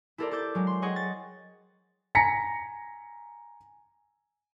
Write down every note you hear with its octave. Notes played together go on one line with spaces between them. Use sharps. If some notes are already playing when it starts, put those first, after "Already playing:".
E4 G4 A4 A#4 C5 D5
A4 D6 G6 A6
F#3 G#3
C6
G#4 C#5 D#5 F#5 G5 C#6
A6
G#5 A#5 A#6 B6 C#7